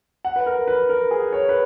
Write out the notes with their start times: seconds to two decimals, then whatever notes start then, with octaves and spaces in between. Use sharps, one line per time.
0.25 F#5
0.36 B4
0.46 A#4
0.68 B4
0.89 A#4
1.11 G#4
1.32 C#5
1.49 B4